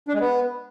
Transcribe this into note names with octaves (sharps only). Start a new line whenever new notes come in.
D4
G#3
B3